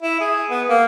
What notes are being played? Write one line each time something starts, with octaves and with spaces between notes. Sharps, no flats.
E4
G#4
B3
A#3